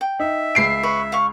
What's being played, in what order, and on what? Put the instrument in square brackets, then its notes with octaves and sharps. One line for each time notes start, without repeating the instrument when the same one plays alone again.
[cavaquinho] G5
[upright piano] D#4 [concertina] E5
[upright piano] C#2 C7 D7
[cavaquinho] B4 C#5
F5 C#6